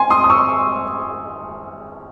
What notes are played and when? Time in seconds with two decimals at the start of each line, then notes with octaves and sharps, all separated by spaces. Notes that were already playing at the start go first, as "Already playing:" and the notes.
Already playing: G#5 C6
0.10 C6 D#6
0.24 D#6
0.30 C#6 E6